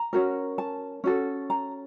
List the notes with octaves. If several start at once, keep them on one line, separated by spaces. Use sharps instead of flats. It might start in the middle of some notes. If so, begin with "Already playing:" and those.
Already playing: A#5
C#4 F#4 A#4
A5
C#4 F#4 A4
A#5